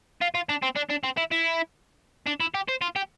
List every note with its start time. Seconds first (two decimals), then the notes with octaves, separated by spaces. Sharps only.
0.22 F4
0.35 F4
0.49 D4
0.62 C4
0.76 D4
0.90 D4
1.03 C4
1.17 E4
1.31 E4
2.27 D4
2.40 E4
2.54 G4
2.68 C5
2.81 F4
2.96 G4